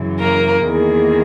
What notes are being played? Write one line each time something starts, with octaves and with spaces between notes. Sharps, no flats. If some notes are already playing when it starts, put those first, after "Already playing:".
Already playing: F#2 C#3 E3
A#3 A#4
E2 D#3 A#3 G#4